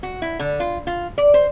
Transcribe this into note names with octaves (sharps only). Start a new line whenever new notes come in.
F#4
E4
D3
F4
F4
D5
C5